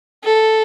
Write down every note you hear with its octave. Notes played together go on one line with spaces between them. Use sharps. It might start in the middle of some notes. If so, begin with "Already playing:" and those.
A4